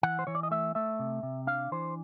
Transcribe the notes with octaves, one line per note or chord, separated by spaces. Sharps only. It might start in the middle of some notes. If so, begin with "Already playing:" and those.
E3 F#5
C5
E3 C#5
D5
D#5
A3 E5
A3 E5
C3
C3
D4 F5
E3 C5